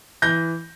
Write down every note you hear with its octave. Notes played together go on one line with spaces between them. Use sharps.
E3 G6 A#6